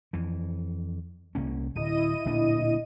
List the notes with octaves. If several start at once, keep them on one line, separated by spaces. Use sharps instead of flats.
F2 E3
C2 A#3 C#4
D1 E4 D#5 D#7
D1 A#2 D4